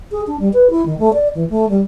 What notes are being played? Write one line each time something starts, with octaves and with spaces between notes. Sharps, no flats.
G#4
D4
G3
B4
E4
D#3
A3
D5
E3
A3
G3